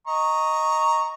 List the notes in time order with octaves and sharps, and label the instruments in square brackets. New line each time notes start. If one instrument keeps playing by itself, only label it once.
[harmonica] D#5 A#5 C#6